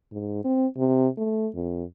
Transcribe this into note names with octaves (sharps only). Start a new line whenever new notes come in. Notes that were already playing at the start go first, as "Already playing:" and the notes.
G#2
C4
C3
A3
F2